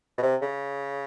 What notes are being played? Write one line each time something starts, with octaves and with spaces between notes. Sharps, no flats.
B2
C3
C#3